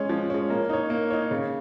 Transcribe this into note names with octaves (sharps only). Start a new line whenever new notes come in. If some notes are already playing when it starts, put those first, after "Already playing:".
Already playing: G#3 C#4
F3
G#3 C#4
A#3
D#4 C#5
A#3
D#4 C#5
C#3